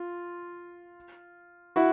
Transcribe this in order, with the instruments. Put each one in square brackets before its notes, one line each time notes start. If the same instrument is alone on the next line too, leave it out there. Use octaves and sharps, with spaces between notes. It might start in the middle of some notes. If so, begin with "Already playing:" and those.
Already playing: [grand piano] F4
E4 F#4